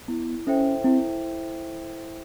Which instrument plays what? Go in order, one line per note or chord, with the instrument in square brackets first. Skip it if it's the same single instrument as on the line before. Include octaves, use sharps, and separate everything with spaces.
[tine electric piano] B3 [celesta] E4
[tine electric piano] C#4 [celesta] A4 C5 E5 G5
[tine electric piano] C4 [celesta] E4